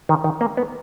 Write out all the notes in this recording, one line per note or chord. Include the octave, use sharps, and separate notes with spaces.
D#3
D#3
A#3
B3